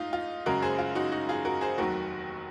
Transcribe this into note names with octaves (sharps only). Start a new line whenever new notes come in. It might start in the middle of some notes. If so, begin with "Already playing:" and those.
Already playing: G#2 D#4 F4
F4
F#2 C#3 G#3 C#4 F#4 A#4
G#4 C5
F4
D#4 F#4
D#4 F#4
F4 G#4
F#4 A#4
G#4 C5
F1 D#2 D#3 F#3 F#4 A#4